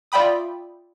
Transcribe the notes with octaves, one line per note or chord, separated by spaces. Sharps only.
F4 D5 E5 G5 B5 D#6